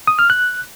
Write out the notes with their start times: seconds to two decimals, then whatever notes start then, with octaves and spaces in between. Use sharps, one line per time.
0.07 D#6
0.19 F6
0.30 F#6